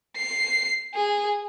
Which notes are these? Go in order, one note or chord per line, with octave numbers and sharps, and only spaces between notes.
C7
G#4